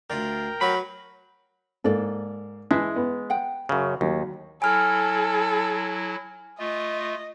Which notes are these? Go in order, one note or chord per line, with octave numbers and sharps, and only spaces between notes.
D2 F4 A#4 D5 G5
F#3 F#4 B4 B5
G#2 A#3 A4 D5
E3 G#3 B4 E5 A5
B3
F#5 G5
F#2 C#3
D#2 F#3
F#3 E4 A4 G#5 F6
A3 F4 D#5